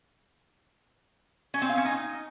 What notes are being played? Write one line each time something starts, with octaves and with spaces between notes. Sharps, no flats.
C#4
C4
F5
C#4
D#4